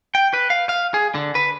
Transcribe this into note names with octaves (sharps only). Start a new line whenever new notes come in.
G5
B4
F5
F5
G#4
D3
B4